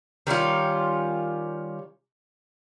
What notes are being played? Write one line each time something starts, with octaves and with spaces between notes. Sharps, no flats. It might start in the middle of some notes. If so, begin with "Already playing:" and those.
D#3 G3 C#4 F4